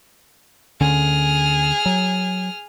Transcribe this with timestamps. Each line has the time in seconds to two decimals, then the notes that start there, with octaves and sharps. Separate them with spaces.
0.81 D2 D3 C#4 G#4 F6
1.86 F#3